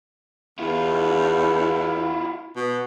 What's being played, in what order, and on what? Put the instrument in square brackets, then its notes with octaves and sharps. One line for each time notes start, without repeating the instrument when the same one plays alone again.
[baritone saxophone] E2 [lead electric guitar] E4 F4
[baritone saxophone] B2